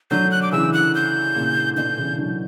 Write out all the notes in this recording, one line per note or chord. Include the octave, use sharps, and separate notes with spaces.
D3 F#3 G6
F#6
D6
C#3 E3 E6
F#6
G6
A#2 C#3
B2 D3 G6
C#3 E3
D3 F#3